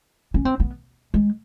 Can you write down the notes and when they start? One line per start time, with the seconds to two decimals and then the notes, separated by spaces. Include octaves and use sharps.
0.34 C#4
0.45 C4
0.60 B3
1.14 G#3